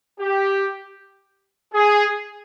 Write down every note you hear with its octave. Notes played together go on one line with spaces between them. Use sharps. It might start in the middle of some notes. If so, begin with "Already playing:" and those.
G4
G#4